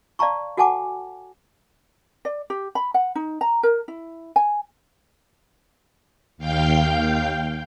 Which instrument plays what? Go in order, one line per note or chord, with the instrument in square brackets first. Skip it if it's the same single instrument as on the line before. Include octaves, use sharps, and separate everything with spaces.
[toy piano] D5 F5 A5 A#5 C#6
F#4 A4 F#5 G#5 A5 D6
[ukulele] D5
G4
B5
F#5
D#4
A#5
A#4
E4
G#5
[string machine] D#2 F5 G5 G6